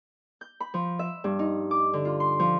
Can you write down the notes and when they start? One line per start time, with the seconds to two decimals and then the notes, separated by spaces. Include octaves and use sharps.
0.41 G6
0.60 B5
0.74 F3
0.99 E5
1.24 G2
1.39 D#4
1.71 D6
1.93 D3
2.05 F4
2.20 C6
2.39 F3